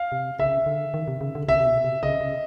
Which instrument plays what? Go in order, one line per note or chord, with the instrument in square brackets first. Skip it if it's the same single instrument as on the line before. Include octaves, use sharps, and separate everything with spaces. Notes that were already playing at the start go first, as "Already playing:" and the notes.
Already playing: [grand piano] F5
[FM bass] C3
[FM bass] C#3 [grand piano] E5
[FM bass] D3
D#3
C3
C#3
D3
[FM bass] C3 [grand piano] E5
[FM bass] C3
B2
C3
[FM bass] C#3 [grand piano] D#5
[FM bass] C#3